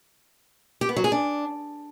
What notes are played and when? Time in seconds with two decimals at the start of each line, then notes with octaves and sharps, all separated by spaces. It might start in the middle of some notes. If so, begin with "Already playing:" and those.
0.81 G4
0.89 B3
0.96 F#3
1.04 G#4
1.12 D4